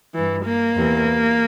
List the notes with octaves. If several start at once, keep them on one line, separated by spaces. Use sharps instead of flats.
G2 E3
A#3
E2 C3 E3